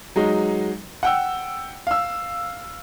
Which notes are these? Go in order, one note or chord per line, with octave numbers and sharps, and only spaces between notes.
F#3 G#3 D#4
F#5 G5 E6
F5 E6